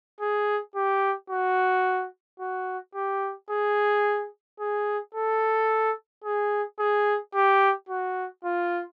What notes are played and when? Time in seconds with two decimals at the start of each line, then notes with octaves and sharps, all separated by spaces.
0.21 G#4
0.75 G4
1.30 F#4
2.40 F#4
2.95 G4
3.50 G#4
4.60 G#4
5.15 A4
6.24 G#4
6.79 G#4
7.34 G4
7.89 F#4
8.44 F4